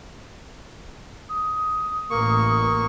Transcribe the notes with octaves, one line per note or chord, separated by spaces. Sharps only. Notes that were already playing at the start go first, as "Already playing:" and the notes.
D#6
A1 A#3 C#6